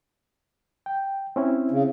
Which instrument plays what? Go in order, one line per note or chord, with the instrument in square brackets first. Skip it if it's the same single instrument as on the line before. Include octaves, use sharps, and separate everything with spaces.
[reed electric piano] G5
C4 C#4 E4
[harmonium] C#3